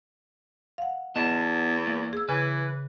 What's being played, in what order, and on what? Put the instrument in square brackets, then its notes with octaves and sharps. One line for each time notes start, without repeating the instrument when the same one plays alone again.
[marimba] F5 F#5
[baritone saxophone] E2 [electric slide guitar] B3 A5 [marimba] D#5
[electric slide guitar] A#3
[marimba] G#4 E6
[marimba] C#3 G#5 G#6 [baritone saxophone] E3 [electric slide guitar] B4